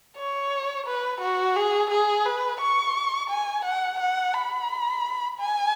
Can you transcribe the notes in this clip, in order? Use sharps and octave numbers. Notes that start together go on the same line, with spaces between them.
C#5
B4
F#4
G#4
G#4
B4
C#6
G#5
F#5
F#5
B5
G#5